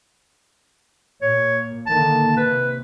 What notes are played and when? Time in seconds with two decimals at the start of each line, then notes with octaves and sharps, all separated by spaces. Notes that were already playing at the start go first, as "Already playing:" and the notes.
1.22 A#2 C#5
1.87 D3 D#3 A#3 A5
2.37 C3 B4